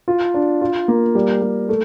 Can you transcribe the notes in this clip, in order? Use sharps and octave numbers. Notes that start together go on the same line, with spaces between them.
F4
D4
F4
A#3
G3
G3
A3